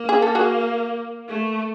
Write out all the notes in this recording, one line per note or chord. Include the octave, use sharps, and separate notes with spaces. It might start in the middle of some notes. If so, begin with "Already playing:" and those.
Already playing: A#3
G#4
A4
F#4 G#4
A3